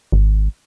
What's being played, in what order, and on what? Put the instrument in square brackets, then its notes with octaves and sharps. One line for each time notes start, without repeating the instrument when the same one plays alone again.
[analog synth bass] G#1